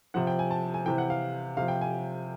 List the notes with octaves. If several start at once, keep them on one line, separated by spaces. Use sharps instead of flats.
C3 F3 F#5
G5
G#5
A5
G#5
C3 E3 G5
F#5
F5
C3 F3 F5
G5
G#5